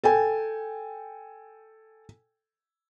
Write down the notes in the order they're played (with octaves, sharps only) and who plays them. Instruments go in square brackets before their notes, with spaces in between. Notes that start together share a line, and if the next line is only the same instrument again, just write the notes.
[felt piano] A4 G5 G#5